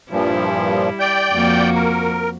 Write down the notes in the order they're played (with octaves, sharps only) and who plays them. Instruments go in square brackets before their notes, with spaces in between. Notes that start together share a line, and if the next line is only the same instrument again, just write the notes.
[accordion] G2 A#2 F3 [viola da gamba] G3 E4
[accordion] D5 G5 G6
[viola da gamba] F2 A#3 F#4
[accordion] A#4